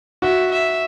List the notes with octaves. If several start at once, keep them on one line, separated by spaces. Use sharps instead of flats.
F#4 E5
E5